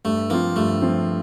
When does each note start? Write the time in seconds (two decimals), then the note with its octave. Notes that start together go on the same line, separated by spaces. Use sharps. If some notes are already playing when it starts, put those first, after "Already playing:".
0.05 G2 A3
0.30 F3 A#3 C4 F4
0.56 G2 A3
0.82 F3 C4 F4